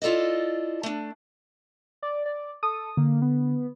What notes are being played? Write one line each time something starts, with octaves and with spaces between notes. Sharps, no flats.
E4 F4 A4 D5 D#5
A3 D4
D5
D5
A4 D#6
D3 A#3
B3